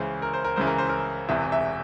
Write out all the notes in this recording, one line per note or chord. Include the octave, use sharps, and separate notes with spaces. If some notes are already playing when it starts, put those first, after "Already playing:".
Already playing: C#2 C#3 E3 C5
A#4
C5
A#4
C#2 C#3 E3 C5
A#4
C5
A#4
E1 E2 C3 E3 E5
E5